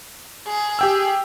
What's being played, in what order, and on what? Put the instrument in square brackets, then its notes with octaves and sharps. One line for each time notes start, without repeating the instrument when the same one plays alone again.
[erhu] G#4
[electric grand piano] G4 G5 E6